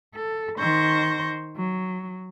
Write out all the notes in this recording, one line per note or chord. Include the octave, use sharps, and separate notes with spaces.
A4
D#3 C5 C#6 G6 A#6
F#3